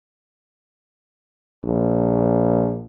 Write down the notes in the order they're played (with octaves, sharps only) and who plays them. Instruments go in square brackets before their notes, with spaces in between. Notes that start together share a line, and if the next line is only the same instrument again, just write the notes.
[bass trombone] A#1